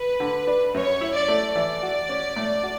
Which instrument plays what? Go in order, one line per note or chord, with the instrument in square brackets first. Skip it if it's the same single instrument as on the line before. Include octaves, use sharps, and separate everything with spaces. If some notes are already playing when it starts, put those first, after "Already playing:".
Already playing: [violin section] B4
[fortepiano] D3
D4
[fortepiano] F#2 [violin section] C#5
[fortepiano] E4
[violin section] D5
[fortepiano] A3
[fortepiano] E3 [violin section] D5
[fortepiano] F#4
C#4
A2
F#4